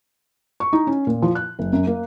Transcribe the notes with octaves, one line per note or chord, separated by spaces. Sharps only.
C#6
D#4
C#4
A#2
F3
F#6
F#1
F#2
A#3